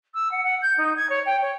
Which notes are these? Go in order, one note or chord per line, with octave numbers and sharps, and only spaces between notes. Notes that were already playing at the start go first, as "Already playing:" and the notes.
E6
F#5
F#5
G6
D#4
G#6
C#5
G5
C#5